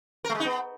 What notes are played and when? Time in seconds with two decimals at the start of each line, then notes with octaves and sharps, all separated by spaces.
0.25 A#4
0.30 A3
0.35 G#3
0.40 D#4
0.45 B3